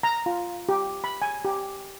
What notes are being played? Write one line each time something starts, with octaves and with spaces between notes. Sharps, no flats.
A#5
F4
G4
B5
G#5
G4